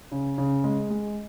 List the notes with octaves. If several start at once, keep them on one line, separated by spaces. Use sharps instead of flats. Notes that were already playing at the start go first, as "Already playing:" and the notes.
C#3
C#3
G#3
G#3